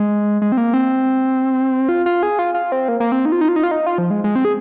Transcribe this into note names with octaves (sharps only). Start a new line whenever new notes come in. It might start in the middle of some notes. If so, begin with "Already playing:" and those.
Already playing: G#3
G#3
C4
A#3
C4
F4
F4
G#4
F4
F4
C4
A#3
A#3
C4
D#4
F4
D#4
F4
D#4
F4
D#4
F4
F3
G#3
G#3
C4
G#4